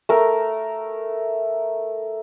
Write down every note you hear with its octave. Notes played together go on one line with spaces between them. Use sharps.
A3 A#4